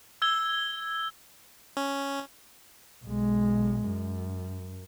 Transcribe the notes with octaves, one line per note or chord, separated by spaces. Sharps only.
E6 G#6 G7
C#4
B1 G#3
F#2